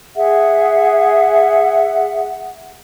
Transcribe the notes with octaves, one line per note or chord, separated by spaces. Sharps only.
G#4 E5 F#5